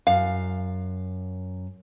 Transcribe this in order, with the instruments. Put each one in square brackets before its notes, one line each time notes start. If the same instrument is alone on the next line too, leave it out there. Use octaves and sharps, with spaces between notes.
[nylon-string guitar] F#2 [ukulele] F5